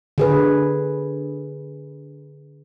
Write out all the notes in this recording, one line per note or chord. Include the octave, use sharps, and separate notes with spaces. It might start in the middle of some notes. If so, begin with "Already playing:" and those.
D3 G#4 B4